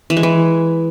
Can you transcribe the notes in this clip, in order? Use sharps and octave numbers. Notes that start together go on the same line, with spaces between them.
E3
G#3
E3